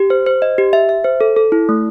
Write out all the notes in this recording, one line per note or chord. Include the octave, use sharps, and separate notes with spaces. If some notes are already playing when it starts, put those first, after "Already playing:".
Already playing: G4
C5
C5
D#5
G4
E5
E5
C5
A4
A4
E4
A3